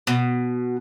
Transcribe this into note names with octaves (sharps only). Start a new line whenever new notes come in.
B2